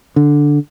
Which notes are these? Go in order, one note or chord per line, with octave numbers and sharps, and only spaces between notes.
D3